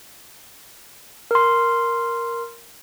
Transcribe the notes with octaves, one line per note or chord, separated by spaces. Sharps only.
A#4 C6